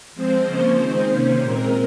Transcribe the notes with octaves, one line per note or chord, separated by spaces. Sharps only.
F3 G#3 C4 C5
C#3 F3 A#3 C#4 C5
D#3 G#3 C4
C3 D#3 A#3 C#4 C5
A#2 G#3 C4 A#4